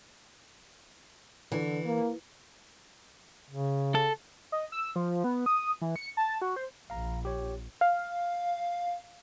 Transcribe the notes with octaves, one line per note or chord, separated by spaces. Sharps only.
D3 E3
A#3
C#3
A4
D#5
E6
F3
B3
D#6
E3
C#7
A5
F#4
C5
A#1 F5 A#5
G4 C#5
F5